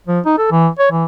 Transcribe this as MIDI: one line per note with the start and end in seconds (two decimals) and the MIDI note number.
0.07 0.20 53
0.25 0.33 63
0.38 0.48 69
0.51 0.68 52
0.79 0.88 73
0.91 1.05 52